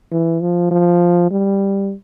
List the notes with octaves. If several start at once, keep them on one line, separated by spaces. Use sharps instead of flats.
E3
F3
F3
G3